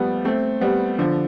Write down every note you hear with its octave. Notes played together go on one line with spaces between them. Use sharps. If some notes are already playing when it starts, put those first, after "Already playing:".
Already playing: F3 G3 A3 B3
A3 C4
G3 B3
D3 F3